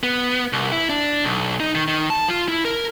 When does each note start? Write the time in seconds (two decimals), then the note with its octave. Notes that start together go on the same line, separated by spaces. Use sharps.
0.03 B3
0.53 C2
0.72 E4
0.89 D4
1.25 B1
1.60 D#4
1.75 D#3
1.88 D#3
2.10 A5
2.28 F4
2.49 E4
2.65 A#4